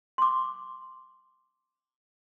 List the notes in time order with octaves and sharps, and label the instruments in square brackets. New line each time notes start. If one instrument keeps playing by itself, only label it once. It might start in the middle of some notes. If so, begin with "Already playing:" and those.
[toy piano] C6 D6